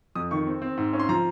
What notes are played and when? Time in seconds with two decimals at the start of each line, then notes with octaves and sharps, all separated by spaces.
0.15 F2 D#6
0.31 D#3 C#6
0.47 C4
0.62 C4
0.77 G#2
0.93 C#4
1.00 C6
1.09 F3 A#5